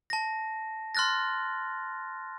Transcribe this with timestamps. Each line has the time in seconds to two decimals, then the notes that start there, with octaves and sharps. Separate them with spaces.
0.10 A5 A#6
0.95 C6 F6 F#6 A6 A#6